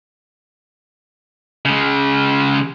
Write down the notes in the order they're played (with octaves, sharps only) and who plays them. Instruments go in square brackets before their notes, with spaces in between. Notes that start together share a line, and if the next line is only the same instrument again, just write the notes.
[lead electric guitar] C#3 G#3